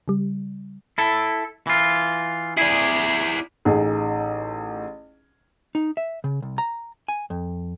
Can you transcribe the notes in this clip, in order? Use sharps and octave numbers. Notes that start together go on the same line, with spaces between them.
C#3 G3
E4 A4
E3 F4
E4 G#4 D5
A1 D#4 G#4
D#4
E5
C#3
C2
A#5
G#5
F2